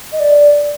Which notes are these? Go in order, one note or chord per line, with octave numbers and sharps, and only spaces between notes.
D#5
D5